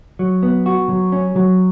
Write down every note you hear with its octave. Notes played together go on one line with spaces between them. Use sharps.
F#3
B3
F#4
F#3
C#4
F#3